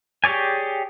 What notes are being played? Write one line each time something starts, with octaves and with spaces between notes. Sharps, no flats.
G4 G#4 C#5 D5 G#5